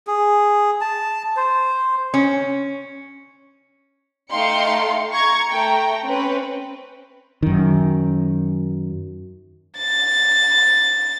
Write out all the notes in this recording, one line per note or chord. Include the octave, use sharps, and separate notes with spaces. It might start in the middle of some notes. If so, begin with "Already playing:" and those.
G#4
A5
C5
C#4
A3 D#4 F5 G5 C6 C#7
A#5 C#6 G#6
A3 G5 A#5
C4 C#4 B4
F#2 D#3
A6